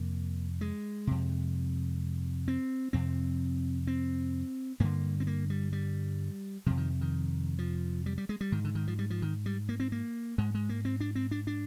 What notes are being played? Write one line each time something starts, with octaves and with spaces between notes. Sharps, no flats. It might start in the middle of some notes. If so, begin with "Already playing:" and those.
Already playing: F2 C3 A#3
G#3
F2 C3
C4
F2 C3 C4
C4
G2 D3 A#3
C4
A#3
G3
G3
F2 C3 F3
D#3
D#3
F3
G3
G3
G#3
G3
G#2 D#3
D3
D#3
F3
G3
F3
D#3
G3
A#3
C4
A#3
G#2 G#3
G#3
A#3
C4
D4
C4
D4
D4